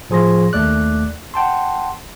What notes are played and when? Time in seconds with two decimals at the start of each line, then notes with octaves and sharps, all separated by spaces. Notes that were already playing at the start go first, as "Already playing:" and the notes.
0.10 A2 F3 G#4 C6 A#6
0.53 D#2 A3 D5 D6 F#6
1.34 F#5 G5 A5 C6